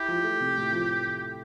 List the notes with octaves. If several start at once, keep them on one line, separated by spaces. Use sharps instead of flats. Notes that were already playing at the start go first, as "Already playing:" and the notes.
Already playing: E4 G4
F3
A3
C3
A2
F3